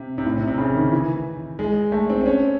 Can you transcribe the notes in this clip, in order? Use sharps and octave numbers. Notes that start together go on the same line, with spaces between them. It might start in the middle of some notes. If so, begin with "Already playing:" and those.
Already playing: C3
C3
A2
C3
C3
C#3
D#3
E3
G#3
A3
C4
C4
C#4